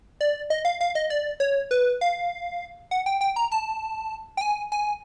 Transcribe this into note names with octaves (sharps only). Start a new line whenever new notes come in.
D5
D#5
F5
F5
D#5
D5
C#5
B4
F5
F#5
G5
G5
A#5
A5
G5
G#5
G#5